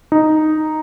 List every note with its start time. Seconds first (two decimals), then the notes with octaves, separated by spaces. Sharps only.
0.12 D#4